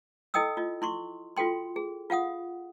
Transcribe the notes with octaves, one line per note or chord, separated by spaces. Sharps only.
E4 A4 D#5 G5 D#6 E6
F4 D#5
E4 C6 C#6
F4 F#4 A4 G5 C6
G#4
F4 F5 F#5 D#6